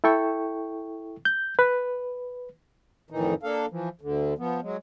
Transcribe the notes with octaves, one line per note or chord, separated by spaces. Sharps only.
E4 A4 G5 C#6
G6
B4
F2 A2 D#3 E3 D#4
A#3 D4 A4 F5
E3 F3
D2 D3
F3 B3
F#3 G#3